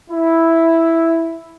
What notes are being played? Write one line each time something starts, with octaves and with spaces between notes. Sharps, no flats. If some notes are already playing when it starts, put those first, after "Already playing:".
E4